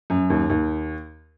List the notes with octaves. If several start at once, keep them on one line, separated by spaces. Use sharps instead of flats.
F#2
D#2
D#2